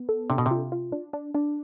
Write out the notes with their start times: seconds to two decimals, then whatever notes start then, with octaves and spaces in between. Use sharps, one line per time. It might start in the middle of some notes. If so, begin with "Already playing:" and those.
Already playing: B3
0.09 A4
0.30 C3 D4
0.38 B2
0.46 C3 F4
0.72 F4
0.92 D4
1.13 D4
1.35 D4